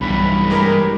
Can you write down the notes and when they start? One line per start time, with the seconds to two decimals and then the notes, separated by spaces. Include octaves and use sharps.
0.01 B1 G2 E3 B5
0.50 G#3 G4 A#4